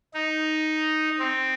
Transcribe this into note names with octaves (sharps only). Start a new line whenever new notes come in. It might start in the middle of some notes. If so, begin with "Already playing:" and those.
D#4
C4